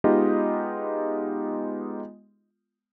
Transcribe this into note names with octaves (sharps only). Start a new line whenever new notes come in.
G#3 B3 D#4 F4 G4 D#5